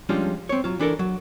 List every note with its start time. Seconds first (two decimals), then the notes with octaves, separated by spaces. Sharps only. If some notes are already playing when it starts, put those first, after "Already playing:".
0.09 F3 G3 G#3 C#4 D4 F4
0.49 C4 C#5
0.64 F#3 F4
0.79 E3 D4 A4 A#4
0.99 F#3